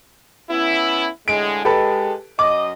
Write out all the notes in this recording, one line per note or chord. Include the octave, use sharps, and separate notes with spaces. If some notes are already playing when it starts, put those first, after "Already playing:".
B3 C#4 E4
A2 D3 G#3 D7
G#3 G4 A4 B4
F#2 D#5 D6